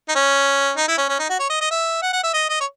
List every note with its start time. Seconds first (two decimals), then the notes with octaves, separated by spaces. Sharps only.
0.09 D#4
0.15 C#4
0.77 D#4
0.88 E4
0.98 C#4
1.09 C#4
1.19 D#4
1.30 F#4
1.39 C#5
1.50 D#5
1.61 D#5
1.71 E5
2.02 F#5
2.13 F#5
2.23 E5
2.34 D#5
2.49 D#5
2.61 C#5